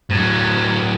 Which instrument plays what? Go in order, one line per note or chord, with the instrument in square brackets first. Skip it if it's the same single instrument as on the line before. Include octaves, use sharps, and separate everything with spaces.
[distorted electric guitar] A2 F#3